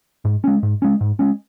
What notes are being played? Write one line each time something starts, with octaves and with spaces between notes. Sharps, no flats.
G#2
G#3 C#4
G#2
G#3 C#4
G#2
G#3 C#4